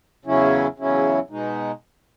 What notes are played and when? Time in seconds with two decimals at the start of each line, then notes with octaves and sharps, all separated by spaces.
0.25 E2 C#3 F#3 C#4 E4
0.78 E2 C#3 F#3 C#4 E4
1.30 B2 G#3 D#4